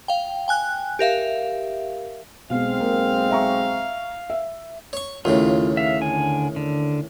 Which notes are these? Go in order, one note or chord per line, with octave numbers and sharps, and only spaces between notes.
F5 G5
G5 G#5 F#6
G4 A#4 E5 F5
B1 B2 G#3 C4 F5
A#3
E5 A#5 C#6
E5
C#5 C#6
D#2 A2 C#3 F4
E5 F5
D3 G#5
D3